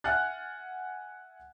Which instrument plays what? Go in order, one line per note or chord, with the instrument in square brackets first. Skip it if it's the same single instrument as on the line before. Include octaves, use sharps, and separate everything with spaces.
[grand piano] E5 F#5 G#5 F6 F#6 A6